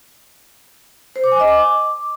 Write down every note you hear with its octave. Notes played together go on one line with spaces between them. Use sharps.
C5
D6
G#5
D#5
D6